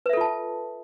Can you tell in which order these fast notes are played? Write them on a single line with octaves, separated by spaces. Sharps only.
B4 E5 A4 F4 A5